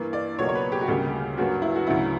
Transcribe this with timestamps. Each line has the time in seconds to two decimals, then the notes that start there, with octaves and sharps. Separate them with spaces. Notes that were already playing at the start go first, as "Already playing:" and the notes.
Already playing: G2 E3 A#3
0.13 D5
0.39 C#2 B2 F#3 A#3 C#5
0.49 C#5
0.55 B4
0.72 G4
0.81 F#4
0.88 D2 C#3 G3 A#3 G4
1.37 G2 F#3 A#3 F#4
1.62 E4
1.76 F#4
1.87 D2 C#3 F#3 E4